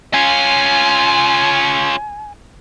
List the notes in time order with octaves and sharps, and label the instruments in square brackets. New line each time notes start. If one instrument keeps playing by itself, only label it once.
[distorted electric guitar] C#4 F4 [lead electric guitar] G#5